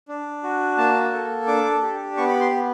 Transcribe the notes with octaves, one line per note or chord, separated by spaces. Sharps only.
D4
F#4
A#3 A5
A4
D4 D6
G4
B3 C#6
B5
C6
B3